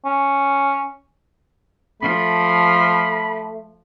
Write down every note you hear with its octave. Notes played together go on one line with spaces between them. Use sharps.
C#4
F3 A3 B5